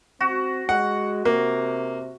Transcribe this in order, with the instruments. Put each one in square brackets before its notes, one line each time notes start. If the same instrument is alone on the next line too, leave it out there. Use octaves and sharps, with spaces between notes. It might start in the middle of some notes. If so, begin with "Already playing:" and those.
[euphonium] C4 [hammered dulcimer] F#4
[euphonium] G#3 [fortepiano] F#5
[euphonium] C3 [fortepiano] A#3